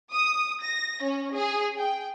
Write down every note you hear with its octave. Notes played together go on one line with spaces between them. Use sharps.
D#6
A#6
C#4
G#4
G5